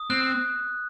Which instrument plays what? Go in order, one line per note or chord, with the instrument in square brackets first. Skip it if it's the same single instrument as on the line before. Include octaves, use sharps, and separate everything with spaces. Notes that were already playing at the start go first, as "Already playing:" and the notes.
Already playing: [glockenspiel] D#6
[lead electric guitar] C4 [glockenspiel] F#6